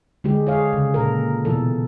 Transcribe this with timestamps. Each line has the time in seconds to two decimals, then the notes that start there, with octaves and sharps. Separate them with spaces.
0.24 D3 G#3 G4
0.47 G#4 C#5 F5
0.73 C#3
0.94 A#2 A4 A#4
1.45 B2 E3 A4